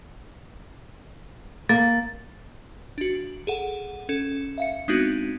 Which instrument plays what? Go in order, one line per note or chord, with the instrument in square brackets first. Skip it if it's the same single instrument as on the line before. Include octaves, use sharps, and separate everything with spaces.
[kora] A#3 [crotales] A6
[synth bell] D4 F#4
G#4 A4 F#5
C#4 A4
E5 F5 C#7
G#3 B3 C4 D4 D#4 F#4